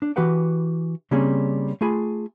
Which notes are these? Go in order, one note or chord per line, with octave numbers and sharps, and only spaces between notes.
D4
E3 F#4 G4 B4 F#5 G5
C#3 G3 A#3 C4 C#4 G#4
A3 F4 G#4 G#5 B5